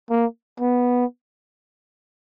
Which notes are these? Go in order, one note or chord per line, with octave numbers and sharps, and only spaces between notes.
A#3
B3